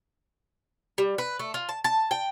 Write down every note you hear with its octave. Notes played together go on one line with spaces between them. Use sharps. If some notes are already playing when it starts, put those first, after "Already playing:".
G3
B4
A3
F4
A5
A5
G5